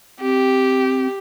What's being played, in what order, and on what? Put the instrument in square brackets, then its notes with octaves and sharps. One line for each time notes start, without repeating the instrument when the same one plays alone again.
[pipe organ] C4 [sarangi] G4